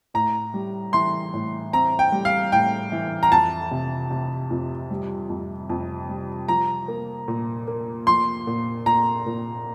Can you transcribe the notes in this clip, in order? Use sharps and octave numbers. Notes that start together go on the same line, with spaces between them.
A2 A#5
G3
E3 C6
A2
C4 A#5
G5
G3
F5
A2 G5
E3
A#5
F2 A5
C3
C3
F2
G3
F2
F2
G3
F3 A#5
A#3
A#2
A#3
F3 C6
A#2
A#2 A#5
A#2